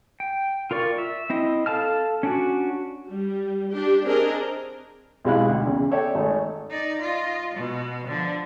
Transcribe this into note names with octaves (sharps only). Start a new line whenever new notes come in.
G5
F4 A#4 D5 C#6
E5
C4 E4 D#5
A4 F5 A5 F6
C#4 D4 F#4
G3
D4 G4
C4 D4 G#4 A#4 D#5
B1 C3 G#3 E4 F5 F#6
D2
E2 C#3
A4 C#5 D5 E5 G5
G#1 A3 D#4
D#4 D5
F4 D#5
B2
D3 F3